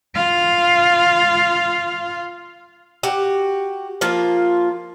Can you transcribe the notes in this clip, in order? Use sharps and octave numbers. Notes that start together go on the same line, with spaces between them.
F4 F5
F#4 G4
F3 A#3 F4